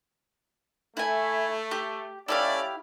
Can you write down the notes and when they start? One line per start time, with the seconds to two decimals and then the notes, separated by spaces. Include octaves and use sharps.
0.97 A3 E4 G#5
1.71 G4
2.28 A3 C#4 E4 G4 D5 F5